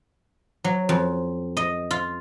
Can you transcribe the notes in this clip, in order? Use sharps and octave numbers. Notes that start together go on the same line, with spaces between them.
F#3
F2
D#5
F4